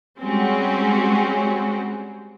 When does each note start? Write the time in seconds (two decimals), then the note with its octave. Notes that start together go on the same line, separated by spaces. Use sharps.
0.21 G3 G#3 C4 C#4 F#4